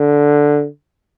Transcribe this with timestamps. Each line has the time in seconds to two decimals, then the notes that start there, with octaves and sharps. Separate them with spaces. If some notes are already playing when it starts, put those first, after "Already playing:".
Already playing: D3